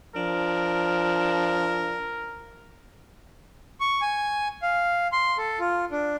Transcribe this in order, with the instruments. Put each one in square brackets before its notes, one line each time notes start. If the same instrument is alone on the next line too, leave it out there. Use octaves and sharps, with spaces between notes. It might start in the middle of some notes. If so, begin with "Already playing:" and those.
[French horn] F3 [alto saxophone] D4 [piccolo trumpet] A#4
[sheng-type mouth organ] C#6
G#5
F5
C6
A4
F4
D4